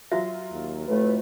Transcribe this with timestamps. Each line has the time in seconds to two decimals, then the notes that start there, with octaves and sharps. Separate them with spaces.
0.12 F#3 F4 F#4 E5
0.51 D#2
0.88 F2 A2 A3 B4